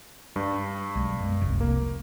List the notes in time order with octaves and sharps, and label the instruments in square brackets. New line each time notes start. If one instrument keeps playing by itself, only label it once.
[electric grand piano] G2 [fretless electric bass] G3
[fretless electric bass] B1 G#3
F#2 G#3
F1 C2
[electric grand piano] A#3